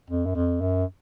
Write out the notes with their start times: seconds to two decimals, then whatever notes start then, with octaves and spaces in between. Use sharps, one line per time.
0.10 F2
0.26 F#2
0.35 F2
0.61 F#2